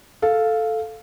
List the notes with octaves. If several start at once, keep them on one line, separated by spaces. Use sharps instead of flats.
A4 F5